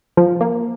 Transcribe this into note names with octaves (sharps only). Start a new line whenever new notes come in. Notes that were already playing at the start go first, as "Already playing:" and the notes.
F3
A#3